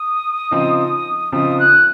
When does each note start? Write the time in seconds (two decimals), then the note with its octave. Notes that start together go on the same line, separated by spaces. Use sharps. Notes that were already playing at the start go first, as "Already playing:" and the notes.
Already playing: D#6
0.51 C#3 F3 C4 D#4
1.32 C#3 F3 C4 D#4 D#6
1.59 F#6